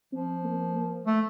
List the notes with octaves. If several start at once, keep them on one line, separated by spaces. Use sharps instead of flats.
F3 C4
A#3
A#3
A3